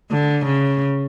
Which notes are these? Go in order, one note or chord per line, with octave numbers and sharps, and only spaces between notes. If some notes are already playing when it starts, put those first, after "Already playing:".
D3
C#3